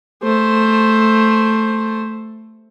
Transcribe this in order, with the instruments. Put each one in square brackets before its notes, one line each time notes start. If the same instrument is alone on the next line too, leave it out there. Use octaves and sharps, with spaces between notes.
[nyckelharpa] A3 C5